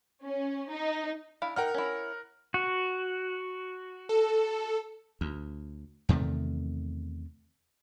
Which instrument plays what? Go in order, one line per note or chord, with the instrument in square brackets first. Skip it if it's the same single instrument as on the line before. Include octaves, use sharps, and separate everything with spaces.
[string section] C#4
D#4
[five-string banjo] D4 E4 F5
[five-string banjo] D#4 G5 [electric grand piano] A#4 F#5 F6
[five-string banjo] C#4 E4
[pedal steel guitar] F#4
[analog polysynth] A4
[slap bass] D2
E2 C3 D#3 A3